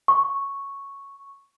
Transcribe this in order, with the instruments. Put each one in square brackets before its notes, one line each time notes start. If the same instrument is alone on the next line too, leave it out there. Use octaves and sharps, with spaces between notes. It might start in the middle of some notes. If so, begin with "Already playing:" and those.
[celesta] C#6